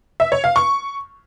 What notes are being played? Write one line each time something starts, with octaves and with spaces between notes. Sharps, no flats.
E5
C#5
F5
C#6